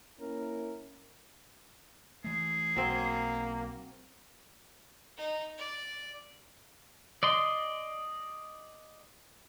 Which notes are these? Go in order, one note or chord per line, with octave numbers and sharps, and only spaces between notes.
A#3 C#4 E4 A#4
E3 A3 G#4
B1 F#3 A#3 C4
D#4
D5
D5 D#5 C6